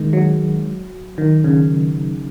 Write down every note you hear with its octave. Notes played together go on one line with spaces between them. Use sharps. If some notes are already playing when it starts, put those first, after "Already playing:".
Already playing: D#3 G#3
F#3
D#3
C#3